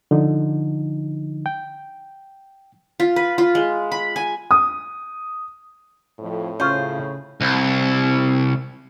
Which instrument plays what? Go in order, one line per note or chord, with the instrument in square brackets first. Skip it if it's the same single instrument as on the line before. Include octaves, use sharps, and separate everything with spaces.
[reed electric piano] D3 F3 D#4
G5
[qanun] F4
B4
F4
G#3
B5
G#5
[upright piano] D#6
[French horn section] F2 [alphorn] A2
[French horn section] C#3 [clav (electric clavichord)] C#4 F4 [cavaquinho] C5
[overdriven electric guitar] C2